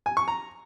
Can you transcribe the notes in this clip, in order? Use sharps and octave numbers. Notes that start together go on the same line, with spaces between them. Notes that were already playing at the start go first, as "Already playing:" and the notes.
G#5
C#6
A#5